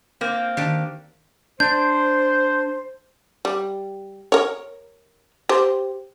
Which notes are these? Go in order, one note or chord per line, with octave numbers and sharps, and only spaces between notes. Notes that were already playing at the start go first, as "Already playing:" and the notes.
A#3 C4
D#3 D4 G4
D4 C5 G6
G3
A#4 C#5
G4 C5